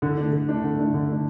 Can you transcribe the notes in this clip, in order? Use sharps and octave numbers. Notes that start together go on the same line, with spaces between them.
D3
A3 D4
D3
A3 D4
D3
A3 D4
D3
A3 D4